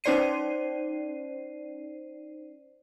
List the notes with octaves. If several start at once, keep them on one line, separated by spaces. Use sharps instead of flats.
C#4 D#4 C5 D5 C7 D#7